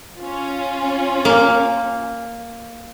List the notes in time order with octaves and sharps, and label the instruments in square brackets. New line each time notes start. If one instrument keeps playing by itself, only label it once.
[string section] C#4 F4
[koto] A#3